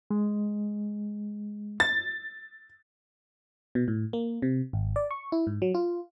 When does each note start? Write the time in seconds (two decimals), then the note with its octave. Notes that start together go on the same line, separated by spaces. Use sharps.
0.11 G#3
1.80 A6
3.75 B2
3.88 A2
4.13 A#3
4.42 C3
4.73 G#1
4.96 D5
5.11 C#6
5.32 E4
5.47 G#2
5.62 F#3
5.74 F4